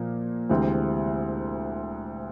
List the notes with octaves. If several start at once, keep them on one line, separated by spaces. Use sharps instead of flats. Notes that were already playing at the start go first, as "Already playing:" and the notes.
Already playing: A#2 F3 A#3
D2 C3 E3 G#3 C4